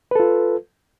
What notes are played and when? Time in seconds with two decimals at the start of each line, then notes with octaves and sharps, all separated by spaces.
0.11 B4
0.16 A4
0.20 F4